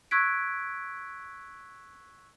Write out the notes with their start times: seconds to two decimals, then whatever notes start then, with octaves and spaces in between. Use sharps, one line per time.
0.11 C#6 E6 F#6 G#6 B6 D7